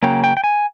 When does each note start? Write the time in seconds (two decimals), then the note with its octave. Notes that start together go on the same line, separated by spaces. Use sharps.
0.03 C#3 F#3 A#3 C#4 G5
0.24 G5
0.37 G5
0.44 G#5